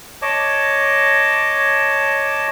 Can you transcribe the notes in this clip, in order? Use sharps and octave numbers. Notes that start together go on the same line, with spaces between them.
C#5 D#5 A5 D6